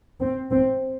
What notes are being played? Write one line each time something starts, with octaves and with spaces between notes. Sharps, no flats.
C4
C4